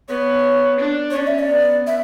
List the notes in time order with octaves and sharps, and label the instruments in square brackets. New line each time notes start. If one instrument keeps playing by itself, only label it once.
[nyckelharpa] B3 [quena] C#5
[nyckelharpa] D4
[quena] C#5
[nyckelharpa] C#4 [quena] D5
[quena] E5
D5
[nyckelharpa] B3
[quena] E5